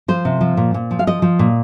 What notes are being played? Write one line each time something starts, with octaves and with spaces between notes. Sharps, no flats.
F3 C5
C3
F3
A#2
A#2
F3
F5
F3 D#5
F3
A#2